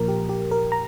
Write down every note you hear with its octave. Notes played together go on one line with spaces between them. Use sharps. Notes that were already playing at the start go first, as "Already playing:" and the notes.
Already playing: A#2 F3 A#3 A#4
G4
G4
A#4
A#5